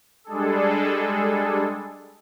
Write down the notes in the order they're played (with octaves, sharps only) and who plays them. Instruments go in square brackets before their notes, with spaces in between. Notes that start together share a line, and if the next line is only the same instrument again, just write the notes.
[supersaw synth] G3 G#3 D4 G#4 A4